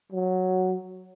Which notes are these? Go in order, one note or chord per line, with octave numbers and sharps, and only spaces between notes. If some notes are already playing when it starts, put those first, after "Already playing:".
F#3